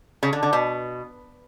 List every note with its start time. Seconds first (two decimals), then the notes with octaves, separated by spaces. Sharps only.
0.23 C#3
0.33 D3
0.43 D3
0.53 B2